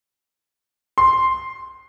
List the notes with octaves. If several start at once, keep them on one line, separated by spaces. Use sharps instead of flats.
C6